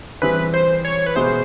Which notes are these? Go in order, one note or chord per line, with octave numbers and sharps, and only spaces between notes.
E3 G3 C4 E4 G#4 B4
C5
C#5
B4
B2 G#3 B3 E4 G#4 C5